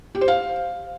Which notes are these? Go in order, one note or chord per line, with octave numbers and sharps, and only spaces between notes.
G4
C5
F5